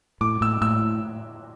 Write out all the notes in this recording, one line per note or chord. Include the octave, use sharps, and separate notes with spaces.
A2 D6
A2 E6
A2 E6